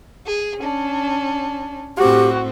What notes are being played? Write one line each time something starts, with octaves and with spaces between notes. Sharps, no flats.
G#4
C#4 D4
A2 C4 F#4 G4